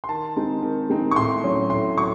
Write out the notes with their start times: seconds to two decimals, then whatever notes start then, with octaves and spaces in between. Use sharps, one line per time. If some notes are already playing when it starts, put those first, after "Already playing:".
0.04 C6
0.09 D#3 A5
0.36 G#3 C4 D#4
0.62 D#3
0.90 G#3 C4 D#4
1.11 C#6
1.16 A2 C6
1.43 F#3 C#4
1.70 A2 C6
1.97 F#3 C#6